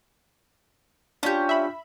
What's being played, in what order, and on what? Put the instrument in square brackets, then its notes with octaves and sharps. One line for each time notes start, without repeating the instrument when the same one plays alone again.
[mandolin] C#4 G4 [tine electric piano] D4 F4
[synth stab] E5 B5